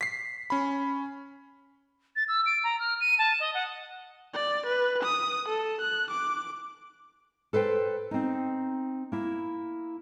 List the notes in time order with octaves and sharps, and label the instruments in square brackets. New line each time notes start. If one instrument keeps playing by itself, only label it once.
[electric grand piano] B6 C7
C#4 B5
[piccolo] A6
E6
D7
A#5
F6
D#7
A5
D#5
F#5
[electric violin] D5
B4
D#6
A4
F#6
D6
[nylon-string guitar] A4 B4 C5 G5
C4 D#4
A#3 E4